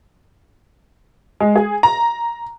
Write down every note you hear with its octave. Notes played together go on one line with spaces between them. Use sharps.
G#3
G#4
A#5